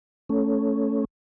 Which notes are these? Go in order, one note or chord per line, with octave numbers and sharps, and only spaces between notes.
A3 C#4